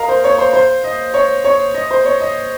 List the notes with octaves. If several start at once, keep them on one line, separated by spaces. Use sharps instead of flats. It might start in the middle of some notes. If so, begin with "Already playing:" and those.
Already playing: A#4 D#5 F5
C5
C#5
C5
C5
D#5
C#5
C#5
D#5
C5
C#5
D#5